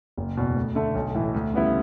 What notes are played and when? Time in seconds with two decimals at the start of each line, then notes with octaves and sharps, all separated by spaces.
0.18 F#1
0.37 E2 B2
0.56 D2
0.75 D3 A3
0.95 B1
1.15 A2 E3
1.34 D2
1.53 C#3 G3 B3 E4